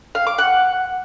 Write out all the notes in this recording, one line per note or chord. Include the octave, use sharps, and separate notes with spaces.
F5
D6
F#5